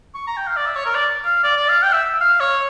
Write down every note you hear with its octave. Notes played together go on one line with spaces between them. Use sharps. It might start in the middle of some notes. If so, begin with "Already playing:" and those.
C#6
A#5
G5
F5
D5
E5
C#5
A#4
D5
F5
D5
D5
F5
G5
E5
F5
C#5